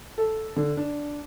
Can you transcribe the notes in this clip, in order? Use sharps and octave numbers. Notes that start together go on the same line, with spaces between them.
A4
D3
D4